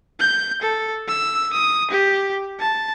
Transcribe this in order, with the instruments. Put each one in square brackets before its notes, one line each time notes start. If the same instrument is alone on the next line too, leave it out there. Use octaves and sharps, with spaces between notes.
[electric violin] G6
A4
E6
D#6
G4
A5